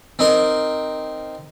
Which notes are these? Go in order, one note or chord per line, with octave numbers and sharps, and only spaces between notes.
C4 D#4 A#4